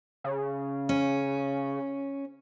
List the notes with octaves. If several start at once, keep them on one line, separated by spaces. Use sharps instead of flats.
C#3
C#4